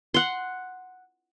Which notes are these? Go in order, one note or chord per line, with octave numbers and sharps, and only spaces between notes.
F#5 C6